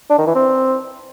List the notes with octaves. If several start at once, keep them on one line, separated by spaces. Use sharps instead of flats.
D4
D#3
E3
C4